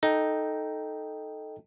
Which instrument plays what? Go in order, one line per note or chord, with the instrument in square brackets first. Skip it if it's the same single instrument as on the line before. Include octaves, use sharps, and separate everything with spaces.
[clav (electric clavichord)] D#4 [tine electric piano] A4 D#5 G5